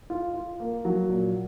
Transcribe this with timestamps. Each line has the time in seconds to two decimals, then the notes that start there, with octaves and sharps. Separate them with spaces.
0.10 F4
0.34 F4
0.60 A#3
0.85 F#3
1.10 A#2